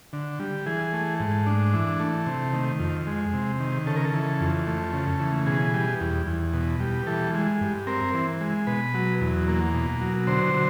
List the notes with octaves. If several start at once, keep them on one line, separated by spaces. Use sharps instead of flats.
D3
G3
E3 G#4
A3
G#2
D4
E3
A3
C3
D#3
F2
G#3
C3
D#3
C#3 A4
A#4
A4
E3
F2
A3
C#3
E3
B2 G#4
G3
E2
E2
B2
G3
E3 A4
G#3
G2
C4 A#4
E3
G#3
B2 B4
F#3
E2
A#3
B2
F#3
D3 C5
F#3